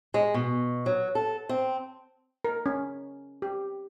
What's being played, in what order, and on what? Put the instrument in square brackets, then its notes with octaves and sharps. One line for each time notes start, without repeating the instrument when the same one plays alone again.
[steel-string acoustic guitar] G#3
B2
F#3
A4
C4
[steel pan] A#4
C#4
G4